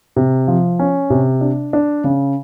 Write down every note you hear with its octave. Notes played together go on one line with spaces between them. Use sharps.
C3
F3
C#4
C3
D4
D4
C#3